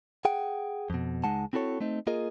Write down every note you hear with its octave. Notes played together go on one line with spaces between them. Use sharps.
G#4 F#5 G5
F2 B2
C#2 G#3 D#4 F#5 A5
C4 E4 F#4 A4 C#5
A3 C4 D#4
A#3 F4 G#4 A#4 D#5